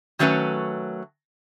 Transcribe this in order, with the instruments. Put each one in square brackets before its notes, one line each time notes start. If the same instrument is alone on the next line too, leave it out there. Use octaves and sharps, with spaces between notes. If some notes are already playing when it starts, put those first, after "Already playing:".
[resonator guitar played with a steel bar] D#3 F#3 A3 C#4 B4